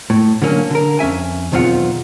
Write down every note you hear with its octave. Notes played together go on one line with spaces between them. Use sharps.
A2
D3 F#3 A#3 C#4
D3 A#4
F2 C#4 E5 G#5
B1 E2 D#3 C4 F4 F#5